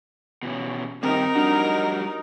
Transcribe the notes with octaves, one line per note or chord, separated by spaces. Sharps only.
B2 E3 C#4
G2 D#3 C4 D#4 G4 A#4
F#3 G3 D4 F#4